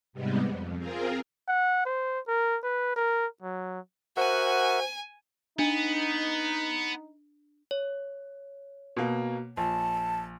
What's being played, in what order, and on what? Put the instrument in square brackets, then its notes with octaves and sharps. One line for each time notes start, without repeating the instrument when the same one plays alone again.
[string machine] G#2 C3 G3 G#3 B3
F2
C4 F4 G#4 A#4
[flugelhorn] F#5
C5
A#4
B4
A#4
F#3
[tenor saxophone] F#4 [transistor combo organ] A#4 E5 F#5 [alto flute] C5 [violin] G#5
[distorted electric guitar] B3 [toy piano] D4 [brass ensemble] D#4
[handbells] C#5
[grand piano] B2 A#3
[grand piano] A#1 [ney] A5